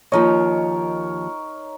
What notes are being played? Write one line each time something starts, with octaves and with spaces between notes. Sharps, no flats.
D#2 F3 D#4 A#4 C#5 D#5